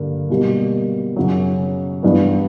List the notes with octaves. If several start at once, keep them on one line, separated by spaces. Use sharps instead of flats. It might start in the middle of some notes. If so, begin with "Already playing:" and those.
Already playing: G2 D3 A#3
B2 G3 A#3
F#2 C#3 F#3
G2 E3 B3